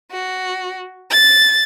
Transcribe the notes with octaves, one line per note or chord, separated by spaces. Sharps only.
F#4
A6